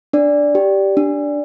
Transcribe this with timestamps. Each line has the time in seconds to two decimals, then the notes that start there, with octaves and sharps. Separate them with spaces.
0.13 D4 D5
0.55 G4
0.97 D4